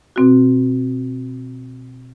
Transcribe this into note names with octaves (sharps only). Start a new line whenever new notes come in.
B2 C4 F#4